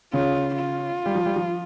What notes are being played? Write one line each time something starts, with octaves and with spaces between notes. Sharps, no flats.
C#3 C#4 F4
F4
G3
F3
G3
F3